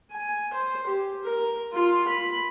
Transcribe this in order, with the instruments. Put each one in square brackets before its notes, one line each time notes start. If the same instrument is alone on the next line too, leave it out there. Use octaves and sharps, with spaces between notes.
[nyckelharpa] G#5
C5
G4
A#4
F4
B5